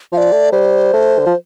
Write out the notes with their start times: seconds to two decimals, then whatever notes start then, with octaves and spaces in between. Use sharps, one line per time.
0.12 F3 F5
0.18 D5
0.32 A3
0.52 G3 C5
0.93 A3
1.19 D3
1.26 F3